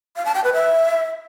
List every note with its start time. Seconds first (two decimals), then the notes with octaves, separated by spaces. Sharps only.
0.16 F5
0.25 A5
0.35 G5
0.44 B4
0.53 E5